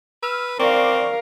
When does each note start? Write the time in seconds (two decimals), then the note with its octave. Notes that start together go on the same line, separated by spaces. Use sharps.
0.23 B4 E6 F6
0.59 C4 A#4 D5 F5 C#6 D6